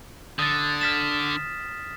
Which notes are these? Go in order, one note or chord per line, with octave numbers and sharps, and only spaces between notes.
D3 D#6 A6
F6 B6 E7